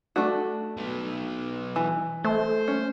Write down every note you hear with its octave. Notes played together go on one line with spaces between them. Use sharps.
A3 D4 F#4
F#3 B3
E3
A3 C5
C#4